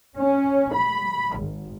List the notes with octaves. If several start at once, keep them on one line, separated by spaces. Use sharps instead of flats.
C#4
B5
G#1